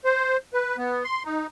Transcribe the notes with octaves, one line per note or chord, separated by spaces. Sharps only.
C5
B4
B3
C6
D#4